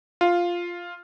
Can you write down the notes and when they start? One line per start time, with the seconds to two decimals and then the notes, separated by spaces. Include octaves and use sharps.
0.21 F4